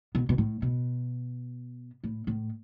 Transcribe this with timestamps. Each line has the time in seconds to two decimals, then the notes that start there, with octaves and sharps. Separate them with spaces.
0.15 B2
0.29 B2
0.38 A2
0.62 B2
2.04 A2
2.27 A2